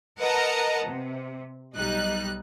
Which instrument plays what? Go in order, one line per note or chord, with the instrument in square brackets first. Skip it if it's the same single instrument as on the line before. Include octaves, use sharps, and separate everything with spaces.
[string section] A#4 B4 D#5 F#5 A5 A#5
C3
B1 G3 D#4 F#6